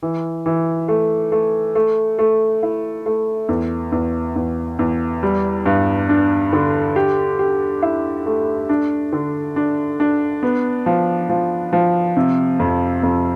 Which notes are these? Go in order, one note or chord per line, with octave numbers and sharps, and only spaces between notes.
E3
E3
A3
A3
A3
A3
E4
A3
E2
E2
E2
E2
G3
G2
D4
D3
G4
G4
E4
A3
D4
D3
D4
D4
B3
F3
F3
F3
C3
F2
F2